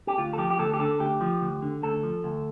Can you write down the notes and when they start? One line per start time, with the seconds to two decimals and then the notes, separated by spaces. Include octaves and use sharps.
0.07 G4
0.18 D2 F4
0.33 A4
0.38 F3 G4
0.50 G4
0.59 D2 A4
0.74 G4
0.79 D3 A4
1.00 D2 G4
1.21 F3
1.41 D2
1.62 D3
1.82 D2 A4
2.03 F3
2.24 D2